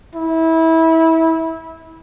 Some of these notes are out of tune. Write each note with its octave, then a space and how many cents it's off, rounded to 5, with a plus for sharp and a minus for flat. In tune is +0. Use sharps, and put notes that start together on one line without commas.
E4 -25